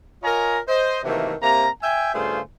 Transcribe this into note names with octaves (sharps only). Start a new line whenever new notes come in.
F4 A#4 C#5 D#5 G#5 A#5
C5 D#5
C3 D#3 E3 F#3 A3 A#3
C3 A#3 A#5
E5 G5 G#5
G2 C#3 A3 F4 G#4 C5